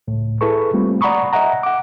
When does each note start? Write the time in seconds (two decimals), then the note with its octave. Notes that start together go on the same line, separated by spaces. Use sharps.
0.08 C#2 A2
0.41 E4 G#4 A4 B4 C#6
0.74 G3 A3 A#3 C4 F4
1.01 D5 F#5 A#5 B5 C#6 D#6
1.33 D#5 E5 F#5 A#5
1.63 F#5 D6